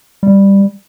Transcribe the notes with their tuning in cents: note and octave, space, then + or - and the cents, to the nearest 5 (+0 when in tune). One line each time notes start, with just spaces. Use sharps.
G3 +10